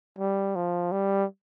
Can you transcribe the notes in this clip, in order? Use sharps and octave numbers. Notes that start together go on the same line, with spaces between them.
G3
F3
G3